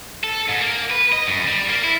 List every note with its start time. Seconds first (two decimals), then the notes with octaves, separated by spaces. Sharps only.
0.24 A4
0.49 G#2
0.61 A#3
0.91 B4
1.12 D#5
1.28 F#2
1.48 G3
1.69 A#3
1.84 E4